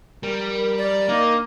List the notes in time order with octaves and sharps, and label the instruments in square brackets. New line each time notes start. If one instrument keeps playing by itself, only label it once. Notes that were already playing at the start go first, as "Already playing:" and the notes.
[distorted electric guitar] G3 [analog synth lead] A#4
[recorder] D5
[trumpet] A#3 [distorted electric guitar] D#4